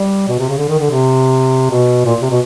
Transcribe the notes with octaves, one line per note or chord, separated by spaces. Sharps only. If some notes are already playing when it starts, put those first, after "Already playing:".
Already playing: G3
B2
C3
C#3
D3
D#3
D3
C3
B2
A#2
C3
B2